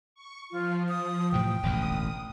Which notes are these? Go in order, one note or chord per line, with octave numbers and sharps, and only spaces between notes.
C#6
F3 F4
D#6
A2 C3 E3 G5
E1 A1 D2 D#6